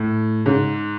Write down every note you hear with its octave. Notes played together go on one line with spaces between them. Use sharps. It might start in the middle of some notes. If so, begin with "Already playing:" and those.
Already playing: A2
G#2 C#3